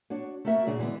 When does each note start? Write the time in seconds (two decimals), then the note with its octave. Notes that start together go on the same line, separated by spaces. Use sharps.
0.10 D4 F#4 C#5
0.45 A3 A#3 F#4 A#4 E5
0.66 A#2 C#3 D4 F#4 G#4
0.79 D3 E3 G#3 B3